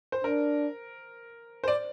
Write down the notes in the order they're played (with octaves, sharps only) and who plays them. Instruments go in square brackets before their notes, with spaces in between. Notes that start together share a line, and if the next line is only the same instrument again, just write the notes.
[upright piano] C5
[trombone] D4 [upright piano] A#4
[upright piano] C5
D5